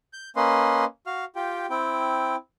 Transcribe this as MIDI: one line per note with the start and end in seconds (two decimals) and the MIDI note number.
0.13 0.30 91
0.36 0.85 58
0.36 0.85 61
0.36 0.85 71
0.36 0.85 75
0.36 0.85 84
1.07 1.25 66
1.07 1.25 77
1.07 1.25 89
1.36 1.66 65
1.36 1.66 67
1.36 1.66 79
1.70 2.36 60
1.70 2.36 64
1.70 2.36 79